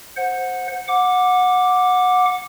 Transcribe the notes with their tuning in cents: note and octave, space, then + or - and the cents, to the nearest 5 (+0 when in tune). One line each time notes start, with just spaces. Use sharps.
C5 +0 F#5 -15
F#5 -20 D6 +0